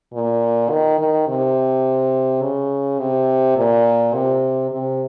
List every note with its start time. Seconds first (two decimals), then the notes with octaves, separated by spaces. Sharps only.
0.14 A#2
0.70 D#3
1.00 D#3
1.28 C3
2.42 C#3
2.99 C3
3.57 A#2
4.14 C3
4.71 C3